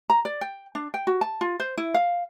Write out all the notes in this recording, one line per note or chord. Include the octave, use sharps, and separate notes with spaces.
A#5
D5
G5
D4
G5
F#4
A5
F4
C5
E4
F5